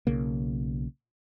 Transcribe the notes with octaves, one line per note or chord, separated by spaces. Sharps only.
B1 C#3 A#3